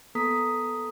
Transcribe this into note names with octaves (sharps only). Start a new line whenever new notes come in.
A#3 B3 A4 A#5 D#6 B6